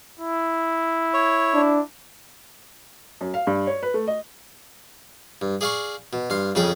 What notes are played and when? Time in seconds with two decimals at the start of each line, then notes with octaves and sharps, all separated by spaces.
0.20 E4
1.14 C#5
1.54 D4
3.21 F#2
3.34 F5
3.47 G2
3.67 C#5
3.83 B4
3.94 A3
4.08 D#5
5.42 G2
5.61 G#4 D5 F5 G#5 C#6
6.13 B2
6.30 G2 F5 C6
6.55 F2 C#3 G#4 A4 G5